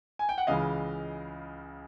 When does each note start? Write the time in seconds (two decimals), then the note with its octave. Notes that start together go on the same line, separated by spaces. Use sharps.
0.19 G#5
0.29 G5
0.38 F#5
0.47 C#2 C#3 E3 G#3 D#5 F5